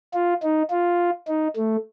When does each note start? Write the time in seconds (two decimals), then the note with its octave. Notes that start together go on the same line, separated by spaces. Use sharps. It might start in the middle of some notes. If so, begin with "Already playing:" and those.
0.14 F4
0.43 D#4
0.71 F4
1.28 D#4
1.56 A3